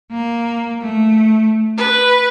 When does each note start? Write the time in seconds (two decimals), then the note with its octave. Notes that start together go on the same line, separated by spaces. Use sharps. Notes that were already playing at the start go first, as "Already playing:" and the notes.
0.11 A#3
0.81 A3
1.77 B4